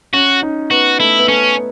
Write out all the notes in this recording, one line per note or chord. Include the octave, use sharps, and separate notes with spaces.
C#4 F#4
D#4
B3 F#4
A3 E4
B3
A3 C#4